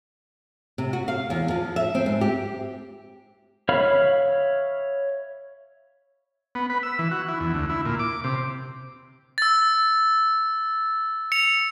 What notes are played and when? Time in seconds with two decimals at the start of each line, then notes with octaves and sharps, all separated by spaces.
0.78 C3
0.93 F#4
1.08 F5
1.30 E2
1.50 F3
1.76 E5
1.95 C4
2.06 G#2
2.21 G4
3.69 C#5 E5 F5 B5 F6
6.55 B3
6.70 B4
6.83 E6
6.99 E3
7.11 F#4
7.28 E4
7.40 E2
7.54 D2
7.70 E4
7.85 A#2
7.99 D6
8.24 C3
9.38 E6 A6
11.32 C#7 F7